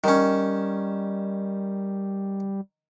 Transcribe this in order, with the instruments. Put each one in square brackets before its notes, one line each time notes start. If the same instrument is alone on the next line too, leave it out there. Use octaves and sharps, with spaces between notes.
[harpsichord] D#3 C#4 [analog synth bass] G3